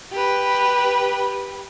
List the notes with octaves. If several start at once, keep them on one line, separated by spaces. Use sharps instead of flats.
G4 B4